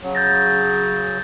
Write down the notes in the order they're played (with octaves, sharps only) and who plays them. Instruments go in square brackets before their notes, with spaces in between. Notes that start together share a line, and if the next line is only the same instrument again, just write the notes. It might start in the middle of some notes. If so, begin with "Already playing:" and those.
[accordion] C#3 F#3
[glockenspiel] G6 A6 A#6